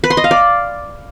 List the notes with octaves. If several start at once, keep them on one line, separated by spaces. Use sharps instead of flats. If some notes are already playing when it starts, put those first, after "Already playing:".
B4
C6
D#5
F5
D5